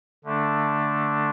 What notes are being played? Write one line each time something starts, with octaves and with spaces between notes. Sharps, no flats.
D3 A3 D4